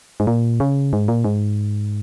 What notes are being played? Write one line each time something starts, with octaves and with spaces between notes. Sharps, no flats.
G#2
A#2
C#3
G#2
A#2
G#2